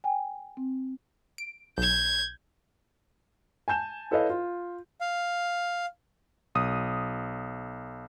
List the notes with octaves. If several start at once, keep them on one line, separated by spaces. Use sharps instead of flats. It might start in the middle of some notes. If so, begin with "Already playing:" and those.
G5 G#5
C4
D7
B1 G6 G#6
G#5 A5 G6 E7
E4 A4 B4 C#5 D#5 F5
F4
F5
B1 D#6